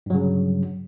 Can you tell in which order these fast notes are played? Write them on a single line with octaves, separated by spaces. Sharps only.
G2 F#3 C#3